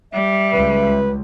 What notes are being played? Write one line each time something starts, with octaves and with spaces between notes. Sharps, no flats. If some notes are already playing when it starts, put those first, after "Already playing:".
G3 E5
C#2 B4